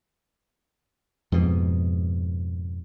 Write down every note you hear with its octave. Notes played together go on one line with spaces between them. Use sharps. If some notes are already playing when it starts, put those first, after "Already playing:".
F2 G#2 B2